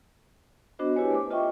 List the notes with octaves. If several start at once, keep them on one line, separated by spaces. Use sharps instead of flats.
B3 D4 F#4 C5 D#5
E4 G4 B4 C#5 G#5
A3 C5 D6
F4 D#5 E5 G5 C#6